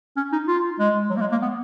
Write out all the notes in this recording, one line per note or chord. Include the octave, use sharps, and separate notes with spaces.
C#4
D#4
F4
G#3
F#3
A#3
G#3
A#3
B3